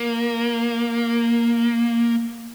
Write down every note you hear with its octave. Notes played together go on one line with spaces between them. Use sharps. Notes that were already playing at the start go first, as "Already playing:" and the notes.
Already playing: A#3